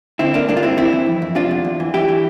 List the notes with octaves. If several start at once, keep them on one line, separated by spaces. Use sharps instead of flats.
D3 C4 E4
D3 A#3 D4
G2 A#3 D4
F4
G2 C4 E4
E3 C4 E4
E3
F2
F2
C3 D4 F4
E2
E2
E3
E3 E4 G4
E3